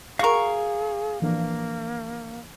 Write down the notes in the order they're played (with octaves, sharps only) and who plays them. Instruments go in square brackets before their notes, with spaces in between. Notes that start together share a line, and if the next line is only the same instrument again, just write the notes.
[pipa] F#4 A#4 [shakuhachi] G#4 [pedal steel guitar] F5 C#6
[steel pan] E3 F3 D4 [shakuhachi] A#3